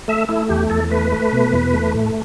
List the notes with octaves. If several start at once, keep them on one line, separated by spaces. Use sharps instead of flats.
A3 E5
A3 E4
E2 G4
E2 A4
A3 B4
A3
B2
E2
A3
A2